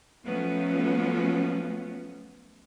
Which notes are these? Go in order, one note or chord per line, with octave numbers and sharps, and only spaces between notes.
F3 F#3 A3 B3 C#4